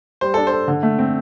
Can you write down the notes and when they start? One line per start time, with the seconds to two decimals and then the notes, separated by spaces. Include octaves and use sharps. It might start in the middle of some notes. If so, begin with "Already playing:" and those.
0.21 G3 C5
0.34 D4 A4
0.47 C5
0.52 A4
0.68 D3
0.83 A3
0.99 C4